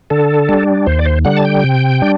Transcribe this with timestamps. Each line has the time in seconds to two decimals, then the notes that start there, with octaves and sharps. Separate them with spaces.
0.10 D3 A4
0.49 G3 D4
0.86 D#2 C5
0.99 D5
1.05 C5
1.25 D3 G3 F#5
1.37 A5
1.45 G5
1.64 C3
2.02 G3 D4